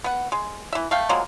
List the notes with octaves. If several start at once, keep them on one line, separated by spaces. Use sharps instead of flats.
B3 F#5
G#3
E3 E5
A3 F5 G5
F3 F#3 G#3 A#3